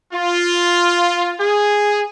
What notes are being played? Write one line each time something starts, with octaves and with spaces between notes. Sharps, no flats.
F4
G#4